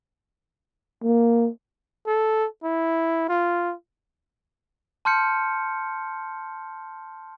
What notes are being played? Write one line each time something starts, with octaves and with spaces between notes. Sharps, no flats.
A#3
A4
E4
F4
A5 C6 F6 G6 C#7